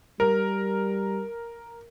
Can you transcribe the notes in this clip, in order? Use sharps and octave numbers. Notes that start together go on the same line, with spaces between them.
G3 A#4